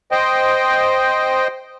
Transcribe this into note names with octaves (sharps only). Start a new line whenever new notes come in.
C5 D#5 G5